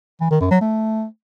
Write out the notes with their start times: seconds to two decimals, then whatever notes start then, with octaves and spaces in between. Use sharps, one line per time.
0.21 E3
0.31 D#3
0.41 F#2
0.51 F#3
0.61 A3